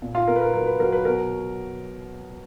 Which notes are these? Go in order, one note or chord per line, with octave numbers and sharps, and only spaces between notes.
A#2
F4 F5
A#2 A#4
B4
A#4
F#3 A#4
B4
F#3 A#4
B4
B2 A#4